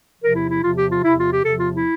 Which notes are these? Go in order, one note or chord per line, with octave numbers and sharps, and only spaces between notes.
E2 C3 F3 A#4
E4
E4
E2 C3 F3 F4
G4
F4
E2 C3 F3 E4
F4
G4
E2 C3 F3 A4
F4
E4